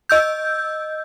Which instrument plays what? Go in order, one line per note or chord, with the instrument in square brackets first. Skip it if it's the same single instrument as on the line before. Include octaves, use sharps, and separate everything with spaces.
[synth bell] D#5 E6 G6